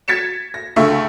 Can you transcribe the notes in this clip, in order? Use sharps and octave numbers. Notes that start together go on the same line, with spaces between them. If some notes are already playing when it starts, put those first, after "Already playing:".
G#6 A6 B6 C#7 E7
A#6
C#2 D3 A3 E5 C#6